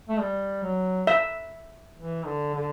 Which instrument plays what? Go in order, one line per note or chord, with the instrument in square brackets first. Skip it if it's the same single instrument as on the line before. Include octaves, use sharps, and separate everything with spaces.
[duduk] A3
G3
F#3
[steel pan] E5
[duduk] E3
D3
D3